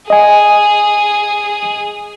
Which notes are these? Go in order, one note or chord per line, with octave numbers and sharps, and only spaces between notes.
G#4 D#5 G#5